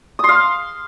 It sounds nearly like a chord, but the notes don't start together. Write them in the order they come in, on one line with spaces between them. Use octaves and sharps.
D#6 C6 F5